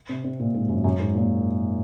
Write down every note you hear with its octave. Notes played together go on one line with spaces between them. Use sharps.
C3
C3
A#2
G#2
F#2
F#2
G#2
A#2